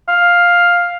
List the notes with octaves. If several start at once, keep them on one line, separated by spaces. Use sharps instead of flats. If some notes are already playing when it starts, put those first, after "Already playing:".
F5